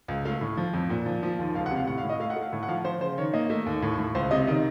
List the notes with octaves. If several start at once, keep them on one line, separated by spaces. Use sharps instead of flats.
C#2
A3 F5
A2
F3
F2
A#2
F3
F3
D#2
C#2 F5
F#5
C3
F5
A2 F#5
F5
A2
D#5
A3 F5
F#5
A3 F5
A2
F#5
F3 F5
F3 C5
C#3 C5
D#3 C#5
A#3 D#5
A3
D#2
A2
A2
C#2 C5
C3 D#5
D#3 D#5